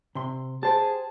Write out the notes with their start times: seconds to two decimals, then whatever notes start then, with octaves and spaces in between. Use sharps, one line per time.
0.15 C3 C6
0.63 G4 G#4 C5 G5 A5